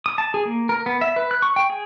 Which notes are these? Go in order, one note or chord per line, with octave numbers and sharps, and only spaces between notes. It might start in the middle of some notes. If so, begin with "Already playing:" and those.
D#6
A5
G#4
A#3
A#4
B3
E5
B4
F#6
C#6
G5
G#4